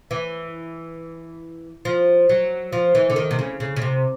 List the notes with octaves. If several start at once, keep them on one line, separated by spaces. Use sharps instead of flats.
E3
F3
F#3
F3
E3
D3
D#3
C3
C#3
C#3
C#3
C3